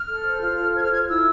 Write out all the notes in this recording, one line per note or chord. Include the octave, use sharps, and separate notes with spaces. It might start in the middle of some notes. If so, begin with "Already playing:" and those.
Already playing: F6
A4
C5
F4
A4
C5 G#6
F6
F4 G#6
E4 E6